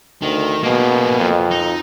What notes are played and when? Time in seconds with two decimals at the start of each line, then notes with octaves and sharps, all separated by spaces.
0.22 D2 D#3
0.63 B2 A#3 G#4
1.20 F2
1.51 D#4